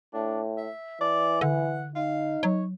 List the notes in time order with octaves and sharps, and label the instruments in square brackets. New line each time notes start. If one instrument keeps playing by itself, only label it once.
[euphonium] A2 [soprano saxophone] D4
[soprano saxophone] E5
[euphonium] E3 [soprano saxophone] D5
[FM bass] D3 [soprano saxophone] F#5
[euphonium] D#4 [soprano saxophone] F5
[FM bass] F#3 [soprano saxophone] C#5